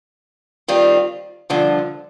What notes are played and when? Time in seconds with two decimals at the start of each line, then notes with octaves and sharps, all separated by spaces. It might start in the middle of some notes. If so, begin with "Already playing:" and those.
0.68 D#3 G3 C4 F4
1.50 G2 D3 F3